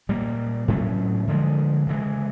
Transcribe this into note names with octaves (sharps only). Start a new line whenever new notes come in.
A#2 G3 A#3
A2 F#3 A3 C#4
D3 F3 G#3
C#3 E3 G#3